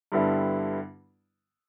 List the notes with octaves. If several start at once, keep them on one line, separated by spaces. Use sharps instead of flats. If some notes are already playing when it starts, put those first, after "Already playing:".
G2 D3 G3 B3 E4